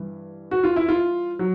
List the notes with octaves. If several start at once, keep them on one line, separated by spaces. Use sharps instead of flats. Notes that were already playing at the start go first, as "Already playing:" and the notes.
Already playing: G2 E3
F#4
F4
E4
F4
F#3